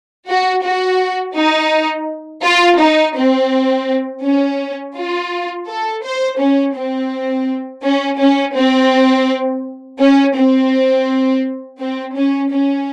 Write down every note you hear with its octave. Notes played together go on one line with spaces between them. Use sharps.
F#4
F#4
D#4
F4
D#4
C4
C#4
F4
A4
C5
C#4
C4
C#4
C#4
C4
C#4
C4
C4
C#4
C#4